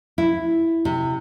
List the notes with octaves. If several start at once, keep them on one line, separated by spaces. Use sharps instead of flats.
E4
C3